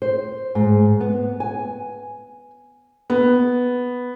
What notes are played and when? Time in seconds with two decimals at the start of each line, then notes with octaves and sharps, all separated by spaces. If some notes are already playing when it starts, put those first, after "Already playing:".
0.02 C5
0.55 G#2
1.00 B3
1.40 G#5
3.10 B3